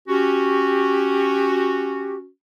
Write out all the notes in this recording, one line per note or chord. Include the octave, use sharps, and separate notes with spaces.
C#4 F#4 G4